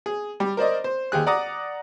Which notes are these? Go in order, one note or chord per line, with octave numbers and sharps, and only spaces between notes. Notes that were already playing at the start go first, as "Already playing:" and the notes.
G#4
G3
A#4 C5 D5 D#5
C5
D#2 G4 G#4 F#6
D5 F#5 A#5 D6 D#6